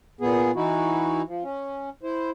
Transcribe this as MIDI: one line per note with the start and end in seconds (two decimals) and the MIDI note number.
0.21 0.51 46
0.21 0.51 59
0.21 0.51 68
0.56 1.22 52
0.56 1.22 63
0.56 1.22 64
0.56 1.22 66
1.27 1.43 53
1.43 1.90 61
2.03 2.30 64
2.03 2.30 72